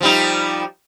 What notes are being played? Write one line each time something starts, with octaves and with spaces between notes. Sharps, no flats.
F3 G3 D#4